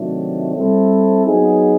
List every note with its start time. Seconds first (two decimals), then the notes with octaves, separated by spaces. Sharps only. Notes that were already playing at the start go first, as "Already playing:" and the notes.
Already playing: C3 D#3 F#3 A3 D4
0.54 G3 C4 E4 A4
1.26 F#3 B3 D#4 G#4